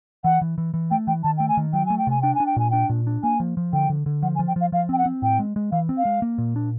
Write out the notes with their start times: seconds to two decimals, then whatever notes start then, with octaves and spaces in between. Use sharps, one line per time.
0.24 E3 F#5
0.41 E3
0.58 E3
0.74 E3
0.91 A3 G5
1.07 E3 G5
1.23 D#3 A5
1.37 A3 G5
1.48 G#5
1.57 D#3
1.73 F#3 G5
1.86 A3 G#5
1.98 G5
2.07 C3 G#5
2.22 D4 G5
2.35 G#5
2.40 D4
2.46 G5
2.56 A#2 G#5
2.70 D4 G5
2.89 A#2
3.07 D4
3.23 A#3 G#5
3.40 F3
3.57 F3
3.73 D3 G5
3.90 D3
4.06 D3
4.23 F3 F#5
4.35 G#5
4.39 F3
4.48 G5
4.56 F3 F5
4.72 F3 F5
4.89 C4 G5
4.98 F#5
5.06 C4
5.22 A2 G5
5.39 G#3
5.56 G#3
5.72 E3 F5
5.89 C4
5.97 F5
6.05 G#3
6.22 A#3
6.38 A#2
6.56 D4